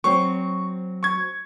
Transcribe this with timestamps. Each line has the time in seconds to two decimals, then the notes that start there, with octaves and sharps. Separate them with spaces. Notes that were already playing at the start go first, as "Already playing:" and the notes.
0.04 F#3 C4 C#6
1.03 C#6 G#6